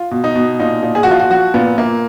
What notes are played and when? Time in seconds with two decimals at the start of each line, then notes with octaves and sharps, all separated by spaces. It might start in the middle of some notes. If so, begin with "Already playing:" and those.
Already playing: F4
0.11 B2
0.24 D#4
0.35 B2
0.59 A#2 D#4
0.83 A#2
0.95 G#4
1.03 F#4
1.06 F3 F4
1.19 F#4
1.30 F3 F#4
1.54 A#2 B3
1.78 A#2 A#3